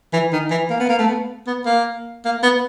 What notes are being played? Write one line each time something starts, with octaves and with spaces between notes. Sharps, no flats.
E3
D#3
E3
A#3
B3
A#3
A3
B3
B3
A#3
A#3
B3